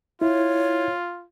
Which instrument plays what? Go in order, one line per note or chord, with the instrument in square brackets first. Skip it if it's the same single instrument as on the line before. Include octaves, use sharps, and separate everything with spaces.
[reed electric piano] E4 [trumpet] F4 [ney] C#5